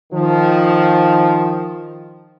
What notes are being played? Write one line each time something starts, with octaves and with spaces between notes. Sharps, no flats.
D#3 F3